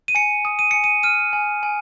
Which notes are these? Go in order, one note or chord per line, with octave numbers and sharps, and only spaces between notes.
D#7
G#5 C#7
D#6
D#7
G#5 C#7
D#7
F6 D#7
G#5
G#5